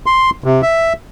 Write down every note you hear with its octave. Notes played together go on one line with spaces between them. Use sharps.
C6
C3
E5